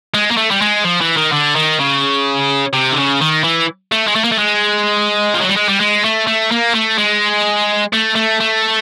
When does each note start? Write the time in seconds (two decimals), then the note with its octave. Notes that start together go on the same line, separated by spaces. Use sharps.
0.14 G#3
0.31 A#3
0.37 A3
0.51 G3
0.61 G#3
0.84 F3
1.01 E3
1.17 D#3
1.32 D3
1.56 D#3
1.80 C#3
2.73 C3
2.92 D3
2.98 C#3
3.21 D#3
3.44 E3
3.92 A3
4.07 G#3
4.15 A3
4.24 A#3
4.32 A3
4.39 G#3
5.34 F3
5.41 F#3
5.49 G3
5.57 G#3
5.69 G3
5.81 G#3
6.05 A3
6.27 A3
6.52 A#3
6.75 A3
6.98 G#3
7.93 A3
8.16 A3
8.40 A3